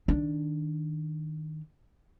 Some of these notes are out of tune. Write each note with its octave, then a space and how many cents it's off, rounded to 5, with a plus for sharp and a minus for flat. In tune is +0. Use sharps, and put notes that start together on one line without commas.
D#3 +0 D4 +0